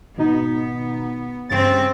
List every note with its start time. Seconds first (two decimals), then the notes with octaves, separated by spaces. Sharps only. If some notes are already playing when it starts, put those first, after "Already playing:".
0.17 G#1 B2 B3 D#4
1.49 G2 C#3 C4 A6